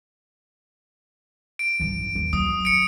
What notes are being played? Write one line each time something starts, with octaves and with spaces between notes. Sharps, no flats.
D7
A1 G2
D#2
F#3 D#6
C#7 D7